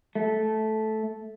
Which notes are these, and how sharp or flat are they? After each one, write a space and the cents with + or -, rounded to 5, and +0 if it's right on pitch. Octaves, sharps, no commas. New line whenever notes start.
A3 -10